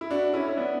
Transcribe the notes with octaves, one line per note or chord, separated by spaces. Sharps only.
E4
D4 F#4
C#4 E4
E4
B3 D4